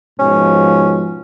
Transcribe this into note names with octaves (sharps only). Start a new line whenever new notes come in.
G#2 B2 F3 C#4